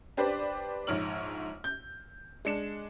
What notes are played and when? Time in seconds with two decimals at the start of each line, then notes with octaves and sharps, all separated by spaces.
0.17 D4 G4 B4 C5 D5
0.87 A#1 G#2 C#5 F6 F#7
1.64 G6
2.45 G#3 D4 C#7 E7